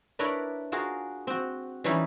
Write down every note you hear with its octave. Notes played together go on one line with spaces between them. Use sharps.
D4 E4 A#4 B4 C#5 D5
F4 F#4 G#4 A#4
C4 F#4
E3 G3 C#4 D#4 E4